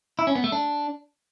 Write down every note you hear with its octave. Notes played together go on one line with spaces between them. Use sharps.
E4
C#4
B3
A3
D4